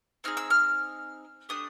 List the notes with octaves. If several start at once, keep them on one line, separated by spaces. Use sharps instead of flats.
C4 D#4 G#4 F6
E6
F6
A3 D4 G4 D#6